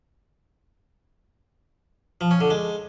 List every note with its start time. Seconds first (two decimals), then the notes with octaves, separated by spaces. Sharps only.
2.21 F3
2.31 C#4
2.41 D3
2.50 G#3